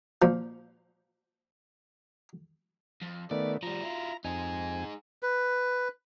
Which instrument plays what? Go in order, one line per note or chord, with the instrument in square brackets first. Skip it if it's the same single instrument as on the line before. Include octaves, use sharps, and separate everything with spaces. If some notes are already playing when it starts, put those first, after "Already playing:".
[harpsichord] A#2 F3
[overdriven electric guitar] F2
[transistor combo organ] D#3 A3 B3 [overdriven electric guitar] D5
[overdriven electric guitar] F3 G3 [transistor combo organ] A#5
[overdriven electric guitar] E4 F4
[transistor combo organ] F2 G#5 [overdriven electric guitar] D#4 G#4
[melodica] B4